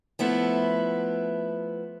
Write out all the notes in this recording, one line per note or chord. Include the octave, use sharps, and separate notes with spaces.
F3 A3 B3 E4